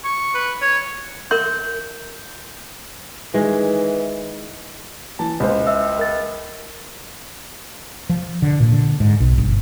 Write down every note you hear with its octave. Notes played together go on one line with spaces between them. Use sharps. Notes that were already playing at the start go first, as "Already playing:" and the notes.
C#6
B4
C#5
A#4 E5 C6 G6
D#3 E3 G#3
E3 A5
C#2 C5
E5 E6
A#4 A6
F3
D3
A#2
D3
G#2
B1
G1